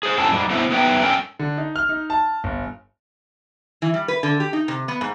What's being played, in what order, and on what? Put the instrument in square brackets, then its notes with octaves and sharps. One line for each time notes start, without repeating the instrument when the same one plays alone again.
[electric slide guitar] G#4 C5
G#2 C4 C#4 E4 A4 A5
G#2 G3
B3 E4 A4 C5 D#5 E5
B3 D#4 B4 E5 G5
G2 A3 C#4 A4 A#4 G5
[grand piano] D3
D#4
F6
D#4
A5
G1
[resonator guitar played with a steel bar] E3
G3
B4
D3
G4
D#4
C3
B3
G#2